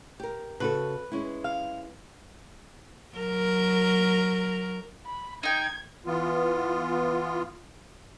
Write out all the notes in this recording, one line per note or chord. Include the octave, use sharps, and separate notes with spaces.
G4 A#4
C#3 F#4 A4 B4
G#3 C#4 E4
F5
F#3 A#4
B5
D#4 G5 G#6
E3 B3 F4